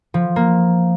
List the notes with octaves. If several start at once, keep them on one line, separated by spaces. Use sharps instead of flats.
F3
A#3